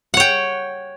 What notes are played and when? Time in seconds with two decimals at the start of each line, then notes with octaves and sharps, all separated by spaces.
0.14 F#5
0.17 C#5
0.20 G5